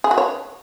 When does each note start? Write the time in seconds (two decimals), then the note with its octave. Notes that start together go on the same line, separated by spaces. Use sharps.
0.04 G#4
0.11 F#4
0.18 C#5